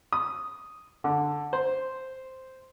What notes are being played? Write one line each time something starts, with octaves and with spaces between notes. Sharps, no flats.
D#6
D3
C5